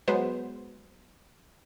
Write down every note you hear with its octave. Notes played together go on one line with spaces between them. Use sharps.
F#3 G#3 B3 C5